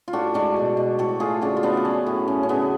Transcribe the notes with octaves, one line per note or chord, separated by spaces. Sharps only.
F4
A2 D4 F#4
G#3 D4 F#4
B2
B2
A2 F#4 A4
A3 F4 G#4
C#3 D4 F#4
F4
A3 B3 D4
B3
F#3 C#4
A2
F#3 C#4
C#4
C#3 B3 D4